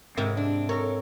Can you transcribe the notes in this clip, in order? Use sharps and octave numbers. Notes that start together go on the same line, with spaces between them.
G#2 C3 C4 E4 A#4
D4
A4 A#4 C#5